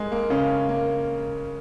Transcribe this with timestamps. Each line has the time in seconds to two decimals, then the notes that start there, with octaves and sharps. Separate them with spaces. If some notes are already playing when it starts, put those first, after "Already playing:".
Already playing: G#2 G3 G#3 A#3
0.12 A#3
0.30 C#3 C#4
0.69 A#3